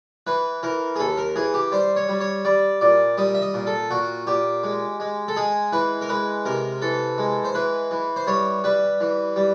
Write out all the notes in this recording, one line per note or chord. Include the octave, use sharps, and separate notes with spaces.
E3 B4
E3 A#4
G#4
D#2 A4
A#4
E3 G#4
G4
G3 C5
C#5
G3
C#5
G3 D5
A#2 D5
G3 D#5
E5
D#5
A#2
A4
A#2 F#4
A#2 G4
G#3
G#3
A4
G#3 G#4
E3 B4
A#4
G#3 B4
C3 A#4
E3 A4
G#3
C5
E3 B4
E3
C5
G3 C#5
G3 B4
E3
G3